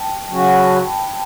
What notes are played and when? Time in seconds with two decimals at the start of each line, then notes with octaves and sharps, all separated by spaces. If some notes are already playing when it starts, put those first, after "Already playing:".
Already playing: G5 A5
0.29 C#3 F#3 C#4 F#4
0.46 B5
0.65 A5
0.82 G5
1.00 G5